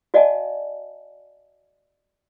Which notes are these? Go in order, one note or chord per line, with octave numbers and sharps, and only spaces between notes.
F#4 D5 D#5 F5 G#5 A5